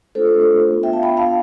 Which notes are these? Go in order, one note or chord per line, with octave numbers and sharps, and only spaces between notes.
A3 D4 F4 A4 C5
B3 D4 F4
E5 G5
F5 A5
G5 B5
F5 A5